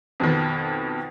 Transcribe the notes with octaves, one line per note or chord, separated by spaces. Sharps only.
F2 B2 D#3